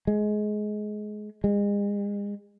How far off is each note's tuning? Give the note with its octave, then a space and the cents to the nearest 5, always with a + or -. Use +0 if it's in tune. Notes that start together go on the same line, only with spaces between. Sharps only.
G#3 +20
G#3 -35